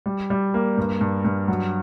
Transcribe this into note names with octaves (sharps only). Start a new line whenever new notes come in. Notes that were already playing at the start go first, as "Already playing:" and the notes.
G3
G3
A#3
G2
G2
G2
F#3